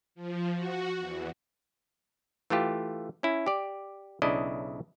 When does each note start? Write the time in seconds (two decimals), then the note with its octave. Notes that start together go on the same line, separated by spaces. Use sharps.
0.15 F3
0.54 F#4
0.98 E2
2.50 E3 A3 F4 G4
3.23 C#4 E4
3.46 G4 D5
4.22 B1 C#3 D4 E4 D5 D#5